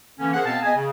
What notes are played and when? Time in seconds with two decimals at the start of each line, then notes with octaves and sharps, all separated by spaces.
0.19 D3 E3 A#3 C#4
0.34 G#4 A#4 C5 F#5
0.45 B2 B3 C4 F5 A5
0.63 B3 G#4 D#5 G#5
0.75 C#3